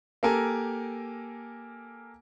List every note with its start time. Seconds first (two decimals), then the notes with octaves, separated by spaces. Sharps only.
0.23 A#3 G4 A4 A#4 G#5